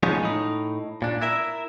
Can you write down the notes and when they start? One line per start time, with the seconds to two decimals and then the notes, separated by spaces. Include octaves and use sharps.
0.03 F3 G#3 B3 C#4 D#4
0.23 A2 D#4
1.02 A#2 D4
1.21 E4 A#4 E5